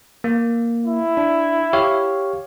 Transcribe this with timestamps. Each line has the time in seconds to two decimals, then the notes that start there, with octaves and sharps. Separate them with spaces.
0.24 A#3
0.85 E4
1.17 D4
1.73 G4 C#5 F5